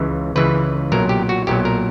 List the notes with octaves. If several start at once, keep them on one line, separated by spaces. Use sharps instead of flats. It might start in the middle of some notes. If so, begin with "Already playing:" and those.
Already playing: C#2 C#3 E3
C#2 C#3 E3 B4
B1 A#2 F#3 A#4
G4
F#4
B1 A#2 F#3 G4
A#4